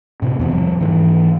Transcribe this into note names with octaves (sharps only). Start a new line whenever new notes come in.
A2 C3
E2 C3 E3
F3 G3
G#2 E3